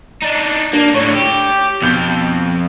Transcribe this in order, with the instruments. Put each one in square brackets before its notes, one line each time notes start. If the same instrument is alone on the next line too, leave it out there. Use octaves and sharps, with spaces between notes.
[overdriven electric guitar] D4 D#4
[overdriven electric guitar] A#3 [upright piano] D4
[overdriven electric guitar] A2 D3 [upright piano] C#5
[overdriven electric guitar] G4
[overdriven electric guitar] F2 [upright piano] B2 G6 G7